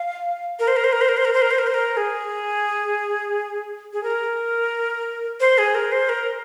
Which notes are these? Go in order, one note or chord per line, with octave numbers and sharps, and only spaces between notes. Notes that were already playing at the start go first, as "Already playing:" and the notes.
Already playing: F5
A#4
C5
A#4
C5
A#4
C5
A#4
C5
A#4
C5
A#4
C5
A#4
C5
A#4
G#4
G#4
A#4
C5
G#4
A#4
C5
A#4